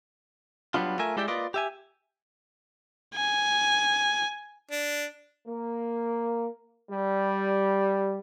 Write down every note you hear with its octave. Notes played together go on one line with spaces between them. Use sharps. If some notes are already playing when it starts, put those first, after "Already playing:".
F#3 G3 A3 B3 D4 F4
A3 F4 A#4 E5 G#5
G#3 E4 G4 D5 E5 G5
A#3 F4 B4 D5 D#5
G4 E5 G#5
G#5
D4
A#3
G3